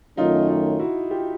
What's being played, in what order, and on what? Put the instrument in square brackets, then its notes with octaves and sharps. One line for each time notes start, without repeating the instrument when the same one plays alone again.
[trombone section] F#2 D#3 F#3 A3 C#4 [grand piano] D#4 F4
[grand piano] D#4 F4
E4 F#4
F4 G4